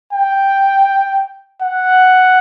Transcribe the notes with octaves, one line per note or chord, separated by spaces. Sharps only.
G5
F#5